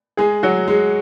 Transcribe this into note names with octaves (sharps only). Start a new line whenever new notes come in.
G#3 G#4
F#3 F#4
G#3